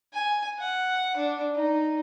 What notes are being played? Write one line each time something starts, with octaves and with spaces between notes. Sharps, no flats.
G#5
F#5
D4
D#4